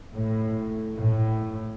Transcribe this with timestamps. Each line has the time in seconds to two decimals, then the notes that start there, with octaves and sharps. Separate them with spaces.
0.13 A2
0.96 A2